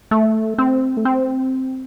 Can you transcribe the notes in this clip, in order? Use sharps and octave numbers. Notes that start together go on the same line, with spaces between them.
A3
C4
A3
C4